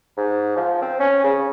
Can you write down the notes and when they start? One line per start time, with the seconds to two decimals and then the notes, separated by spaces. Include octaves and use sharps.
0.17 G#2
0.57 F3
0.82 C4
1.00 C#4
1.24 C#3